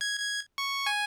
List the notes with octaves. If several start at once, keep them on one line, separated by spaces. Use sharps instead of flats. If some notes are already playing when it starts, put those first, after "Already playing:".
G#6
G#6
C#6
G#5